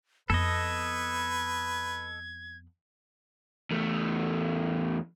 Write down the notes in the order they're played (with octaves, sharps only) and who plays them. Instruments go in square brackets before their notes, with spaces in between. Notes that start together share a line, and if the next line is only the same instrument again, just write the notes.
[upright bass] F2 B3 [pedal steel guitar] A4 D#5 [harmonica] B4 [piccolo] G#6
[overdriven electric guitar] E2 A3